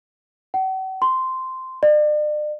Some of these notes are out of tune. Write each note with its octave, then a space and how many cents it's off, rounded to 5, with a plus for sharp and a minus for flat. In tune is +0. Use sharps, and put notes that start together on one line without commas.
F#5 +45
C6 -10
D5 +40